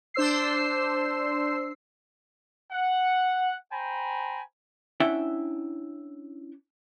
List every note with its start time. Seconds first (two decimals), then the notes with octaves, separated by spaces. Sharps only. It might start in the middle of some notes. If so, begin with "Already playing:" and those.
0.14 D4 C5 E6 C7
2.72 F#5
3.72 C5 G5 G#5 A#5 B5
5.00 C#4 D4 E4 E5 F#5 G5